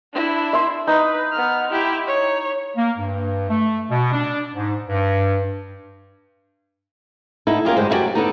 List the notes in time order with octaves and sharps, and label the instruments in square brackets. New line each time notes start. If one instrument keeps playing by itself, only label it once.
[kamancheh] D4 E4
[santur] E5 C6
[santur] D#4 [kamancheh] B4
[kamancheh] B3 F6
E4 G4
C#5
[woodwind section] A#3
G2
A3
B2
D4
G#2
G2
[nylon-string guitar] D3 D#4 E4
A#3 C#4 F4 G4 G#4
D2 G2 G#3 C5
F#2 E4 F#4 G4 D5 G#5
D3 B3 D#4